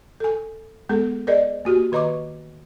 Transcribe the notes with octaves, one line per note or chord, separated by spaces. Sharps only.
A4 G#5
G#3 B3 G#4 A4
G#4 A#4 C5 D5 D#5
A#3 F#4 G4
D#3 B4 D#5 A#5 C#6 D6